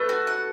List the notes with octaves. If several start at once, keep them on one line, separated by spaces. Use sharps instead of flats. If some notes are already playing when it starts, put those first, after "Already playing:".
Already playing: A3 A4 B4
F#4
F#5